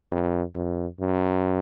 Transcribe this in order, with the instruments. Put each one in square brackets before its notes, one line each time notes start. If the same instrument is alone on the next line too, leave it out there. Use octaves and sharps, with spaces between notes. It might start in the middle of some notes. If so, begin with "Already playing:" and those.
[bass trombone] F2
F2
F#2